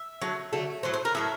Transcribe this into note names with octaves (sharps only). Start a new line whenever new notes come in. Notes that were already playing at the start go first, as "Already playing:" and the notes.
Already playing: E5
D3 F#3 A3
D3 F#3 A3
A2 F#3 A3 C5
C5
A#4
A2 F#3 A3 E5